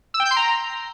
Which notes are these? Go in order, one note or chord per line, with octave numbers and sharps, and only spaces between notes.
E6
G5
G6
C6
A#5